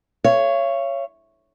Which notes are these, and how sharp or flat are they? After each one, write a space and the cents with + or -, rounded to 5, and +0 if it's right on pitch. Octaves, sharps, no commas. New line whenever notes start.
C#5 +0 F5 -45